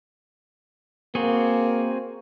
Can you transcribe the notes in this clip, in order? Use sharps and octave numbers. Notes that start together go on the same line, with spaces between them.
A#3 C4 F#4 G#4